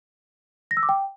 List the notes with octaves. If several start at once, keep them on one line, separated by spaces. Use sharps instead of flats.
A#6
E6
D6
G5